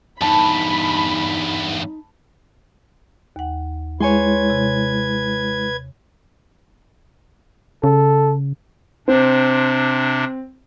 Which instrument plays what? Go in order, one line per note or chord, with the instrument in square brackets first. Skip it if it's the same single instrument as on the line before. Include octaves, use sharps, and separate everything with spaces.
[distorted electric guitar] E2 G2 [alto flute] D#4 [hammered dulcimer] A5 [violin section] B5
[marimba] D#2 F#5
[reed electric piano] G#3 E4 [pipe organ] B4 G#6 [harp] C#5 G#5 C6
[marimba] C3
[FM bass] C#3 [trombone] A4
[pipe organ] C3 D4 [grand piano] C4